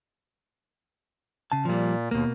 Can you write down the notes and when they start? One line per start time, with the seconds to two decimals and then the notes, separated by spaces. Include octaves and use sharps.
1.52 C#3 A5
1.65 A#2 F3 G3
2.11 D#2 B2 A#3